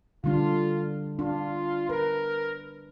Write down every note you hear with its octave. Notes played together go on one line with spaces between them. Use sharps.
D3 G3 D4 F4
D4 F4
A#4 B4